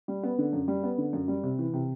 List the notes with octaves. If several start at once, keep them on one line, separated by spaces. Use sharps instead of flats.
G3
B3
D3
F#2
G3
B3
D3
F#2
G3
C3
E3
C3